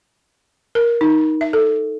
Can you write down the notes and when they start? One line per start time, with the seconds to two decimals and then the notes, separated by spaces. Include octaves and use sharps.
0.75 A#4
1.01 D#4
1.41 E5
1.53 A4